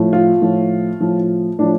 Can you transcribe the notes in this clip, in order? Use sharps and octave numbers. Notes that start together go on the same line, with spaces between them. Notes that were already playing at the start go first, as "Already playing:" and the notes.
Already playing: A2 F3
F4
A2 F3
A2 F3
A2 F3 D4